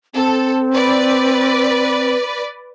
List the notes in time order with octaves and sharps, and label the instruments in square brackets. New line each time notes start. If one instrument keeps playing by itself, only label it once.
[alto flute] C4 [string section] A4
[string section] B4 D5